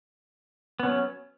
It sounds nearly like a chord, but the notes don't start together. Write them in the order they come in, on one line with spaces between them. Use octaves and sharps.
B3 C#4 F#3